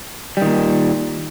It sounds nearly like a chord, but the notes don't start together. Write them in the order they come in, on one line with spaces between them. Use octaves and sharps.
G3 D#3 A#2